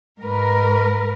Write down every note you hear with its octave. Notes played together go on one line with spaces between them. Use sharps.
G#2 A#4 B4